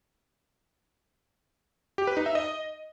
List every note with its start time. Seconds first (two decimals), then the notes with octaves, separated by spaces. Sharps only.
1.98 G4
2.07 B4
2.17 D#4
2.26 E5
2.35 D#5